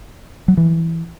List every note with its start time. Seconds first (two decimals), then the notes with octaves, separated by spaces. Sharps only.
0.48 F#3
0.57 E3